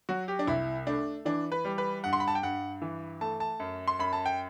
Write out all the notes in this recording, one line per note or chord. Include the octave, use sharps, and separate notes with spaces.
F#3 F#4
G4
D4
C2 E4
A3 D4
E3 D4
B4
G3
B4
G2 F#5
C6
B5
A5
G5
G2 F#5
E3
A3 A5
A5
F#2
C6
F#2 B5
A5
G5